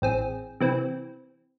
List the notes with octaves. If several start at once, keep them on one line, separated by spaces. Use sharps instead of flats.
A1 C4 G#4
C3 E3 C4